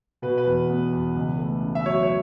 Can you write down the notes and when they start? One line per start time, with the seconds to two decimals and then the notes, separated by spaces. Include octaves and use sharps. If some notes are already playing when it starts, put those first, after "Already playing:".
0.22 B2 B4
0.38 B4
0.46 E2
0.70 B3
0.93 E2
1.15 C#2
1.39 A3
1.63 C#3
1.75 E5
1.86 F#3 C#5
2.03 C#5